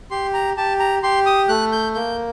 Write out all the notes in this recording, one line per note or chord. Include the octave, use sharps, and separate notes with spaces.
G4 C6
A#5
G4 A5
A#5
G4 C6
D#6
A3 F#6
G6
A#3 G6